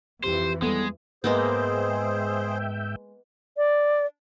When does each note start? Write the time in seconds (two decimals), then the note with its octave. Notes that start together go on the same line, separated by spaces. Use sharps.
0.24 F2 E3 G4 C5
0.62 G3 G#3 B3 A4
1.24 G#2 G#3 A#3 B3 G#4 C5 E5 G5
3.57 D5